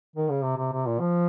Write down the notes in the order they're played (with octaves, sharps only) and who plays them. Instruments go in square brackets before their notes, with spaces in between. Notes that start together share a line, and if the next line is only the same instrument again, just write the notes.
[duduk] D#3
C#3
C3
C3
C3
A#2
F3